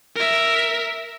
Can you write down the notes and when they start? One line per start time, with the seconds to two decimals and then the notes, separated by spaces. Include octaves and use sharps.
0.15 A#4 E5